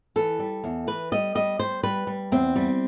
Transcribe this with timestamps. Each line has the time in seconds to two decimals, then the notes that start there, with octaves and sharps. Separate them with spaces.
0.16 E3 A4
0.39 G3
0.64 E2
0.87 E3 B4
1.12 G3 D#5
1.35 G3 D#5
1.59 G3 C5
1.83 G3 B4
2.07 G3
2.32 E2 C4
2.56 G3